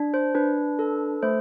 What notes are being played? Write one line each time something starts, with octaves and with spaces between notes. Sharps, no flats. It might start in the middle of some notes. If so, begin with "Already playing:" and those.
Already playing: D4
C5
D4 B4
A4
A3 C5